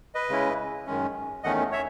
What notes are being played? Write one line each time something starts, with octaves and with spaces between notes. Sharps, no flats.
B4 D#5
C#3 G#3 C#4 E4
F#2 D#3 G#3 C#4
E2 D#3 A3 C#4 D#5 F#5
C#5 E5